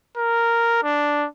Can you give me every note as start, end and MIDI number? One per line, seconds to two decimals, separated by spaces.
0.17 0.81 70
0.83 1.27 62